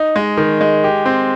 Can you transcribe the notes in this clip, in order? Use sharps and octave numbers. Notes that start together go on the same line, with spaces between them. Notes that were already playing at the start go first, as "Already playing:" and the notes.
Already playing: D#4
G#3
D#3
G#3
G4
C4